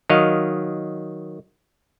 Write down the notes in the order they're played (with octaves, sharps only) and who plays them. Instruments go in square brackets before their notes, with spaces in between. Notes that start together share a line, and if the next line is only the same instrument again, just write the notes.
[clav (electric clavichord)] D#3 F#3 D#5 F5